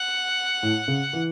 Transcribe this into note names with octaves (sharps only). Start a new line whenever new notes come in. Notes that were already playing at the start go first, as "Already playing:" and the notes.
Already playing: F#5
A2
C#3
E3